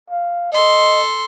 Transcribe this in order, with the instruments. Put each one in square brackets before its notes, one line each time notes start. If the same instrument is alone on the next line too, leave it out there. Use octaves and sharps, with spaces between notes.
[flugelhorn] F5
[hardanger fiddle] A4 C6 [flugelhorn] D#5